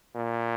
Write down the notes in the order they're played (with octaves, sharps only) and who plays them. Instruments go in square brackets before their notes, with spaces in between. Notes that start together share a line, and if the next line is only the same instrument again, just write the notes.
[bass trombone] A#2